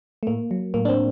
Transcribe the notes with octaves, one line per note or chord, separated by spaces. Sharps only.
A3
A2 A#3
F#3
A2 A#3
D4
C4